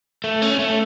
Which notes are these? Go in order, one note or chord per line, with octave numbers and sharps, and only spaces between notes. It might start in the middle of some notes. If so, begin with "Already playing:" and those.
A3
C#4
A3